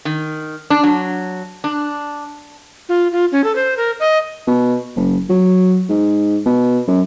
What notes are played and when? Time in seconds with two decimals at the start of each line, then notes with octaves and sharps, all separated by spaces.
0.05 D#3
0.70 D4
0.83 F#3
1.64 D4
2.89 F4
3.12 F4
3.32 C#4
3.44 A4
3.56 C5
3.77 A#4
4.00 D#5
4.47 B2
4.96 F#1
5.29 F#3
5.89 G#2
6.45 B2
6.87 F#2